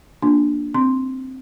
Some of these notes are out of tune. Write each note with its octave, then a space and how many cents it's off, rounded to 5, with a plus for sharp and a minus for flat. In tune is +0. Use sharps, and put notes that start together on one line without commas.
A#3 +0 D4 +0 F4 +5
C4 +0 C6 +0